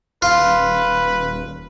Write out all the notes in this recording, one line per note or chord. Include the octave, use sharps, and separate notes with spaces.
D#1 F4 B4